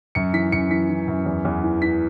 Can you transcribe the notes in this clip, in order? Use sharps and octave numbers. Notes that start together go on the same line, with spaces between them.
F#2 C#7
E3 B6
F#2 C#7
E3 B6
E3
F#2
E2
E2
E3
E3 B6